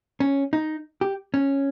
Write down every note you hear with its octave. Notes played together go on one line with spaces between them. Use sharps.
C#4
D#4
G4
C#4